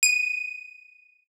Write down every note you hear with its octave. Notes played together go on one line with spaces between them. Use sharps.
D#7